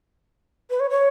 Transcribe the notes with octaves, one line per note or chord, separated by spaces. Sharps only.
B4
C#5
C#5